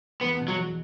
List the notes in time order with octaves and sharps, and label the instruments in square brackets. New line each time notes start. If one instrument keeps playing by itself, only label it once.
[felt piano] E2 [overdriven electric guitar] B3
[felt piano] B2
[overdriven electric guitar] F#3
[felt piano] E2